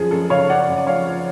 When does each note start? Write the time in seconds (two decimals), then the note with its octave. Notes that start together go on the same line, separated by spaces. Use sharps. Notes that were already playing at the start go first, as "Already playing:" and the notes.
Already playing: F#2 F3 G#4
0.11 F#2 A4
0.30 C#3 C#5 F5
0.49 F#2 D5 F#5
0.68 F#2
0.78 D5
0.87 F3 C#5 F5
1.06 F3